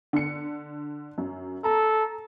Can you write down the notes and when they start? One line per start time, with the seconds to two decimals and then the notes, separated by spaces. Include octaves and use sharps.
0.13 D3 C#7
1.18 F#2
1.64 A4 A#5